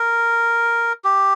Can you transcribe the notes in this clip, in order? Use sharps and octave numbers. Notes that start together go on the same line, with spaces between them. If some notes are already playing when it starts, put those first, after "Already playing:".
Already playing: A#4
G4